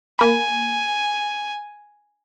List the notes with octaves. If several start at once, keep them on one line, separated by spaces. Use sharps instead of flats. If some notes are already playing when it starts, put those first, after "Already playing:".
A#3 G#5 B5